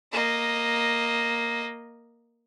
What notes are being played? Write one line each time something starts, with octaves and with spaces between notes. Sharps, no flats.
A#3 D#5